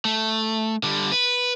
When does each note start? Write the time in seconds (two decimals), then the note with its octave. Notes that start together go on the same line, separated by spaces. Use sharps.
0.05 A3
0.83 D3 G3
1.12 B4